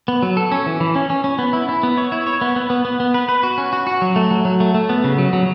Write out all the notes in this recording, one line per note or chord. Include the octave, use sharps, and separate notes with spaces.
B3
F#3
A4
C#4
E3
E3
C#4
C#4
C#4
B3
E4
E4
B3
C#5
E4
C#5
B3
B3
B3
B3
B3
B4
B4
F#4
C#4
F#4
F#4
F#3
A3
F#3
F#3
A3
A3
B3
C#3
F#3
F#3